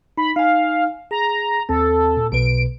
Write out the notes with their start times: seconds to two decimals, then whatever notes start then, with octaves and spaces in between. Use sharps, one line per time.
0.18 D#4 B5
0.36 D#4 F5 G#5
1.11 G#4 A#5
1.69 D#2 C4 A4
2.17 A#2
2.32 B1 B2 B4 D7